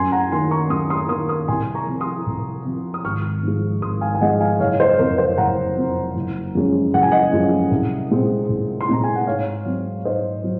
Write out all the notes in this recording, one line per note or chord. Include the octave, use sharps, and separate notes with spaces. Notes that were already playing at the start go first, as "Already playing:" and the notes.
Already playing: F#2 G#5 C6
F#5 A#5
D#3 A#3 G#5 C6
A#5 C#6
F#2 C6 D#6
C6 D#6
D#3 A#3 C6 D#6
C6 D#6
C2 G#5 C6
A#5 C#6
C3 F3
C6 D#6
C2
C3 F3
D#6
G#1 C#6 F6
G#2 F3 G#3
G#1 C6 D#6
F5 G#5
G#5
G#2 F3 G#3 D#5 F#5
F5 G#5
F#1 C#5 F5
C5 D#5
F2 C3 A#4
C5
F#1 F#5 A#5
F2 C3
F#1
F#2 F3 G#3 C#4
F#1 F#5
G#5
D#5 F#5
F#2 F3 G#3 C#4
C2
A#2 G#3 C4 D#4
C2
C6
A#2 G#3 C4 D#4 A#5
G#5
F#5
G#2 C#5 F5
F#3 C4 D#4
G#2 C5 D#5
F#3 D#4